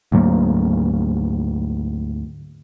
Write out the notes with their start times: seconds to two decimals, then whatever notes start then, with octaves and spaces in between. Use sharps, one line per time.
0.12 D2 G#2 F#3 A#3